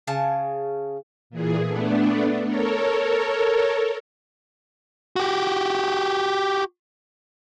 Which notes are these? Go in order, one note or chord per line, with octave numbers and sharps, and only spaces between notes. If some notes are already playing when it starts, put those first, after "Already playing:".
C#3 G#5 A5
A#2 E3 G#4
A3 B3 D4
A4 A#4 C#5
F#4 G4